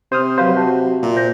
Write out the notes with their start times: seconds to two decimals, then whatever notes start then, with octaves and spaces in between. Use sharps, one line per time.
0.12 C3 C5 D#6 F6
0.38 F#3 B4 C5 F5
0.57 F#4 A5
1.02 A#2 E5
1.16 C5 G6 A#6